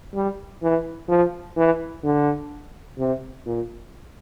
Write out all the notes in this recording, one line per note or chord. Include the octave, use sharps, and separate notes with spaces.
G3
E3
F3
E3
D3
C3
A#2